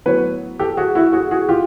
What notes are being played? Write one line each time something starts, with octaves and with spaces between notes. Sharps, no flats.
A2 F#3 B3 B4 C#5
G4 A4
F#4 G#4
E4 F#4
F#4 G#4
F#4 G#4
F4 G4